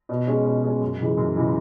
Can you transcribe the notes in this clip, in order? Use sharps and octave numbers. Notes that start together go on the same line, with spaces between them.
B2
G#3 C#4
B2
G#3 C#4
F#2
C#3 E3 G#3
F#2
C#3 E3 G#3